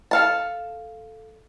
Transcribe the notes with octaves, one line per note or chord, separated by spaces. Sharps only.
A4 F5 A5